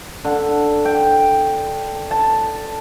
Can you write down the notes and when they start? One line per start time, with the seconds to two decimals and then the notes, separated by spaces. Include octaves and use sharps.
0.24 D3
0.85 G5
2.11 A5